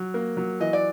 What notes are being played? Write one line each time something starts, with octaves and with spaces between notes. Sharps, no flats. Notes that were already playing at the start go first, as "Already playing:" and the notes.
Already playing: F#3
A#3
F#3
E3 D#5
D5